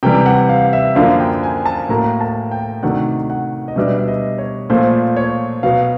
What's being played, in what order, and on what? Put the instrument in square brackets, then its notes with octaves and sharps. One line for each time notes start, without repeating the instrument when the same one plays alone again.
[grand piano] C3 E3 G3 G5
F#5
F5
E5
F#2 D3 F3 A#3 D4 F5
G5
G#5
A5
A2 F#3 A#3 A#5
A5
G5
C3 D#3 F#3 A3 D4 F#5
F#5
D#5
B2 G3 B3 D4 E5
E5
D#5
C#5
A#2 F3 A3 C5
C#5
B2 F#3 B3 F5